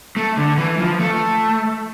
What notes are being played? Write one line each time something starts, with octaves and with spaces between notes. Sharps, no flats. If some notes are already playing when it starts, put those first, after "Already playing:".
A3
D3
E3
F3
A3